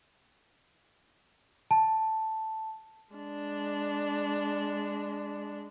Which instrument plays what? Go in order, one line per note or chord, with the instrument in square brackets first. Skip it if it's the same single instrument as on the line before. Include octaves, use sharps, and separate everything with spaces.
[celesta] A5
[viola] G#3 D4